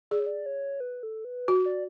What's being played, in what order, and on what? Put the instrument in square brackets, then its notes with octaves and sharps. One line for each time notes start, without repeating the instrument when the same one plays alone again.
[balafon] G#4 [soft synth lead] D5
[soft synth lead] C#5
D5
C#5
B4
A4
B4
[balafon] F#4
[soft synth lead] D5